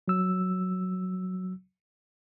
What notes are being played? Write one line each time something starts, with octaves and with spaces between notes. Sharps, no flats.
F#3 E6